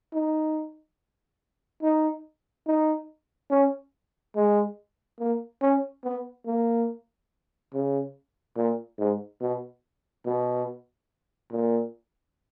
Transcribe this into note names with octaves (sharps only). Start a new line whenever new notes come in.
D#4
D#4
D#4
C#4
G#3
A#3
C#4
B3
A#3
C#3
A#2
G#2
B2
B2
A#2